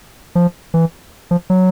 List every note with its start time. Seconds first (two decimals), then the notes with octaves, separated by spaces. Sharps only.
0.35 F3
0.74 E3
1.31 F3
1.50 F#3